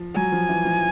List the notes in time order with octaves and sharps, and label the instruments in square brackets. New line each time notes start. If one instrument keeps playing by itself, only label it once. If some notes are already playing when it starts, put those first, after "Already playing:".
Already playing: [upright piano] F3
[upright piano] F#3 [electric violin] G#5
[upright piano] F3
E3
F3